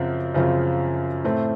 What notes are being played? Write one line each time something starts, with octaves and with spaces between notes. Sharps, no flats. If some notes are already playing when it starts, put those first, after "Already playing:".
Already playing: F#2 C#3 F3 C4
F#2 C#3 F3 C4 F4
A2 A3 C4